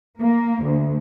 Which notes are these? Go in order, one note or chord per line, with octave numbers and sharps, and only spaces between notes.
A#3
D2